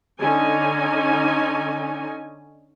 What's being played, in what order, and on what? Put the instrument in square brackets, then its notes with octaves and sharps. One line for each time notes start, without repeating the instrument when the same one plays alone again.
[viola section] D3 C#4 D#4 G#5